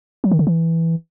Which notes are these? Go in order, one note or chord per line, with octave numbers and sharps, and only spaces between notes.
F#3
D#3
D3
E3